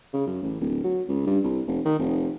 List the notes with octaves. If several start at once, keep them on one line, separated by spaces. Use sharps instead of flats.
C#3
F#2
A1
D1
F#3
C#2
G2
C2
F1
D#3
F1